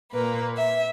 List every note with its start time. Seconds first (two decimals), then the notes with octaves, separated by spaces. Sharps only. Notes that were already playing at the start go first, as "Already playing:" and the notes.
0.12 A#2 A#3 B4
0.56 E5